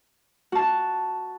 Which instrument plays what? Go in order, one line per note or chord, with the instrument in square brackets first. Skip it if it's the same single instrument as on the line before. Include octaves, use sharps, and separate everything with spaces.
[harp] F#4 A5